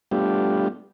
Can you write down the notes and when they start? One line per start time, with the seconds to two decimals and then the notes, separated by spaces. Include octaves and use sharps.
0.11 G3 A3 B3 D4 F4 G4